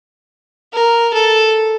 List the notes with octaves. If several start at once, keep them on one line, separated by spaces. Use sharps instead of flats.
A#4
A4